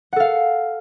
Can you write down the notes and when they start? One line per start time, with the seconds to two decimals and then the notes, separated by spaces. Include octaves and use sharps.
0.13 F#5
0.16 A4
0.20 F5